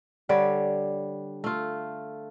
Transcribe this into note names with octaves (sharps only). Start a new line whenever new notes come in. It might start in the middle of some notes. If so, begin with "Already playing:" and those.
D3 G3 C#5 D5
A3 F4